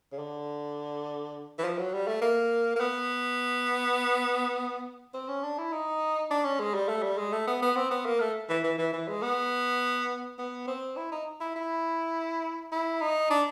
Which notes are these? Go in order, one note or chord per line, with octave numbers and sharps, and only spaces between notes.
C#3
D3
E3
F3
F#3
G3
A3
A#3
A#3
B3
C4
C#4
D4
E4
D#4
D4
C#4
G#3
G3
A3
G3
G#3
A3
B3
B3
C4
B3
A#3
A3
E3
E3
E3
E3
G#3
B3
B3
C4
E4
D#4
E4
E4
E4
D#4
D4